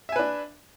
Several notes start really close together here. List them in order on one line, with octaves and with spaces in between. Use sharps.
E5 G#5 B4 D4